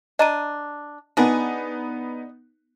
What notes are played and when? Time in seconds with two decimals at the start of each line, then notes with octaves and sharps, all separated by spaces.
0.19 D4 D#5 A#5 D#7
1.17 B3 D4 D#4 G#4